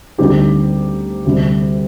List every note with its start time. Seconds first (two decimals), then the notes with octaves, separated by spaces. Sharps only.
0.18 D2 D3 G3 C4 D#4 G4
1.25 D2 C3 G3